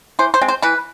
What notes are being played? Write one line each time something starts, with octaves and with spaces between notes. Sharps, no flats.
E3 C5
C5
G#3 C4
C5
E3 B4